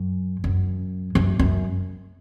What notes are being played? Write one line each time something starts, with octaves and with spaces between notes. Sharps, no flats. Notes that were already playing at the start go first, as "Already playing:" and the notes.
Already playing: F#2
F#2
F#2
F#2